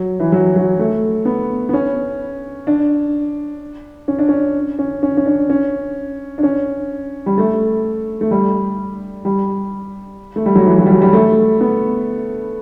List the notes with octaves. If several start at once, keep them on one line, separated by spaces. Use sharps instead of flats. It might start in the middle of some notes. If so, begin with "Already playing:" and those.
Already playing: F#3
E3
F#3
F#3
A3
B3
B3
C#4
D4
C#4
D4
C#4
C#4
C#4
C#4
D4
C#4
D4
C#4
G3
A3
A3
G3
G3
A3
G3
F#3
E3
F#3
G3
F#3
G3
A3
B3